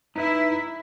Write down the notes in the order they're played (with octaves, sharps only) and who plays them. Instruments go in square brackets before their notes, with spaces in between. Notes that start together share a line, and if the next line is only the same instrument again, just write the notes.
[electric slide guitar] D#4 B4 E5 [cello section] E4